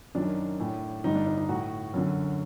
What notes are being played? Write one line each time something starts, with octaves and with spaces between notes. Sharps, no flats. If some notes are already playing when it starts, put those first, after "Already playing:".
F#2 D#3 D4
A2
G2 D3 D#4
D4
D#4
D#4
A2 F#4
F#2 D3